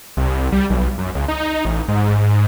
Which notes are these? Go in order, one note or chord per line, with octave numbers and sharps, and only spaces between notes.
C2
G3
B1
F#2
C#2
D#4
A1
G#2
G#2